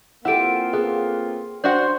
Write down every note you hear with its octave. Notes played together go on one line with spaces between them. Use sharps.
A#3 C4 E4 F4 G4 A4 F#5 D7
B3 G#4 A4
D4 F#4 C5 F#5 G6